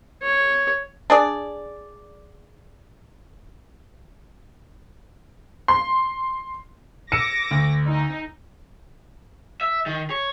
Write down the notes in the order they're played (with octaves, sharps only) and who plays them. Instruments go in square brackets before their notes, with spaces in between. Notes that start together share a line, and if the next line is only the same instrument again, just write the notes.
[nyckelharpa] C#5
[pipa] D4 G#4 D5
[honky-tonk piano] C6
[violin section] D6 A#6 [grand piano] E6 D#7 E7 [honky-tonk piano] C#7
[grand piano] D2
[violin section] D#4
[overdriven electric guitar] E5
D#3
C#5